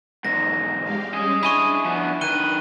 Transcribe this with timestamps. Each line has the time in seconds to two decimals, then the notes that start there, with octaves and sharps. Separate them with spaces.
0.25 E2 G#2 A#6
0.83 G#3 G4 F5
1.14 G3 C#4 G#4 D#5
1.43 D4 E4 G#5 B5 C#6
1.85 F3 B3
2.21 D#3 B4 F#6 D#7 G7